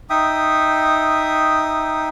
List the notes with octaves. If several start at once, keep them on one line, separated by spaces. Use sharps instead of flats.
D#4 E5 G5 D#6